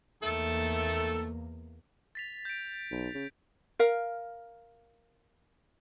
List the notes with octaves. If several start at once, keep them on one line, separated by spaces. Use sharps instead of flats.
E2 D#3 A3 A#3 A4
A6 B6 F7
G6 D7
B1
C#3
A#4 F5